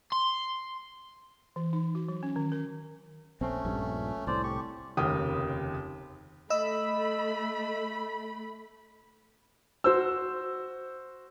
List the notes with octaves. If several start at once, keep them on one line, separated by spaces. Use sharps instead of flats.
C6
E3
D#4
F#4
F#3
C#4
D#3
A#4
A#1 A3 C4 C#4
A#1 G2
C2 A2 C5 D5
G4 C#6
F1 D#2 C#3 A#4 G5 D#6
A3 D#5 B5 E6
F#4 C5 E6